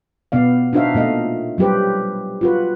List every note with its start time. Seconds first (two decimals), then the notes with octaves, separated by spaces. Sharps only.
0.32 B2 B3 D5 F5
0.73 D4 D#4 F#4 C5 E5 F5
0.95 A#2 A3 D#5 F5
1.58 F#3 G3 G4 B4 C5
2.41 F4 F#4 B4